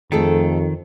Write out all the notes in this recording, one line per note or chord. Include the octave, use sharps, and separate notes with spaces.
F2 D#3 A3 G#4 A4